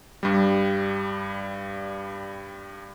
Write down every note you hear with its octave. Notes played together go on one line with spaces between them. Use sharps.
G2 G3